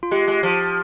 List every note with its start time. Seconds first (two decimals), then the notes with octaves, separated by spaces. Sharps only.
0.03 F4
0.11 G#3 G4
0.28 G#3
0.43 F3